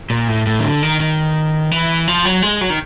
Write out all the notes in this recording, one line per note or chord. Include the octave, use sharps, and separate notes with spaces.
A#2
A2
A2
D#3
D3
D#3
D#3
E3
F3
F#3
G#3
F#3
D#3